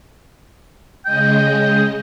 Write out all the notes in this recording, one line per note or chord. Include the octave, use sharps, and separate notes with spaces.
C#3 G#3 D#5 G5